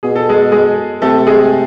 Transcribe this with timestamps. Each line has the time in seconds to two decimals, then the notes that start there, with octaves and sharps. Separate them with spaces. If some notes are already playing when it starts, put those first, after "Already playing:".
0.03 B2 G#4
0.15 A4
0.29 G#3 G#4
0.52 G#3 G#4
1.02 C3 A3 A4
1.27 G#3 G#4